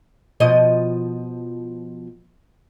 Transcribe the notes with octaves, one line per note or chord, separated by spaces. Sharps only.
B2 F3 D#5